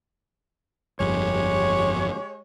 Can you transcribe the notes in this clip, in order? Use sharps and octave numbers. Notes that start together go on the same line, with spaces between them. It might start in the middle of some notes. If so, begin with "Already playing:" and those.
G1 F2 G#3 G4 C#5